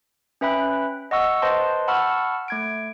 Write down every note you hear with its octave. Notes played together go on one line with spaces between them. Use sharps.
C#4 B4 E5 G5 B5 F#6
D#5 F#5 C#6 E6
B4 C5 D#5 G5 A5 C6
F#5 A5 B5 C#6 E6 F6
A3 G#6 D7